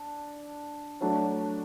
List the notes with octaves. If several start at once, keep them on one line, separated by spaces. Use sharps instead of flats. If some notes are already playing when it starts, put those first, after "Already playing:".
Already playing: D4
F#3 A3 D4